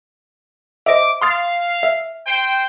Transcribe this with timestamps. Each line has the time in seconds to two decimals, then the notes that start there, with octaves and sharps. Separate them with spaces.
0.86 C5 D#5 E5 D6
1.22 F5 C6 D#6 A6
1.83 E5
2.26 C5 G5